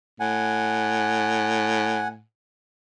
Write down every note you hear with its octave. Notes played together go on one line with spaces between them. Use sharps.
A2 F#5 G#5